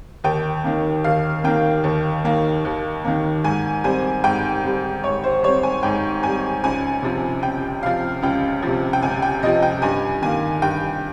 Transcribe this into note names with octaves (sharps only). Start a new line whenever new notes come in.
D#2 G5
D#3 A#3
D#2 F5
D#3 A#3 G5
D#2
D#3 A#3
D#2
D#3 A#3
G#2 G#5
G3 C4 G#5
G#2 G5
G3 C4
G#2 C#5
C5
G3 C4 C#5
G#5
G#2 G5
G3 C4 G#5
C#2 G#5
C3 F3
C#2 G5
C3 F3 F5
C#2 G5
C3 F3
G5
C#2 G#5
G5
C3 F3 D#5
G5
G2 G#5
D#3 A#3 G#5
G2 G5